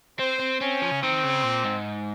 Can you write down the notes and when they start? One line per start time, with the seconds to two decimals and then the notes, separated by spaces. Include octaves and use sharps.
0.19 C4 C5
0.40 C4
0.61 C4 C#4
0.82 F3
0.92 C#3
1.02 D#3 C4
1.24 C#3
1.44 A#2
1.65 G#2